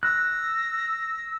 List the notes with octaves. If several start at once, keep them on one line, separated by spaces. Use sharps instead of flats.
E6 F#6 A#6